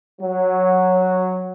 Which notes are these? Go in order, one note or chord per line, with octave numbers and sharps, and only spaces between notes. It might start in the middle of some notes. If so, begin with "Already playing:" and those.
F#3